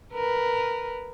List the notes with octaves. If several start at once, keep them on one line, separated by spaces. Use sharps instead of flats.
A#4 B4